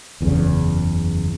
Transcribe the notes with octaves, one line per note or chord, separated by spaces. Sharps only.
F#1 E2 G#2 C#3